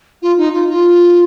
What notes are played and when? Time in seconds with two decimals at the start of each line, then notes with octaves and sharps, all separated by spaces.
0.21 F4
0.37 D#4
0.53 F4
0.69 F4